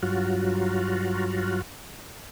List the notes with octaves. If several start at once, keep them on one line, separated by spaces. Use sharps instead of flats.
G2 F#3 F4 F#4